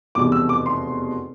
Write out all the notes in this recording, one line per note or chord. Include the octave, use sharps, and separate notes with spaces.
F1 E2 B2 G3 D6
E6
D6
C6